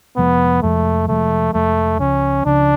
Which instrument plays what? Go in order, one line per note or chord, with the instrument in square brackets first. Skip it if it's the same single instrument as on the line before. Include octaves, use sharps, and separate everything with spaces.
[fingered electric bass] F1 F2 F3 G#3 [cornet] B3
[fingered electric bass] F1 F2 F3 G#3 [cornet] A3
[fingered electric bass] F1 F2 F3 G#3 [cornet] A3
[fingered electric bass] F1 F2 F3 G#3 [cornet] A3
[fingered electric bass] C#2 C#3 F3 [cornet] C#4
[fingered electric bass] C#2 C#3 F3 [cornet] D4